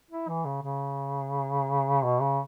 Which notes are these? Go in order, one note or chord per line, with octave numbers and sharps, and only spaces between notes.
E4
E3
C#3
C#3
B2
C#3